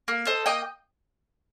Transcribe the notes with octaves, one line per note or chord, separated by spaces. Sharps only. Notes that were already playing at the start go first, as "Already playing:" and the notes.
A#3
A4 C5 D#5
A#3 D#5 G5